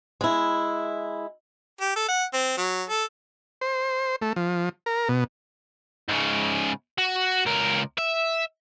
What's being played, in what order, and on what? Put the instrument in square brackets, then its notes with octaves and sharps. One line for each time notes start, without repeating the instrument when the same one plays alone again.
[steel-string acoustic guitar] G#3 E4
[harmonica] G4
A4
F#5
C4
F#3
A4
[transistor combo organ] C5
A3
F3
A#4
B2
[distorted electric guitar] G#2 C#3
F#4
C#2 A#4
E5